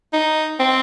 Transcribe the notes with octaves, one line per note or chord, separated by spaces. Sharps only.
D#4
C4